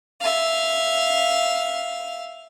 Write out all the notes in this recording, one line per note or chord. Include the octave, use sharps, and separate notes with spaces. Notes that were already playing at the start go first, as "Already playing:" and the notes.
E5 F5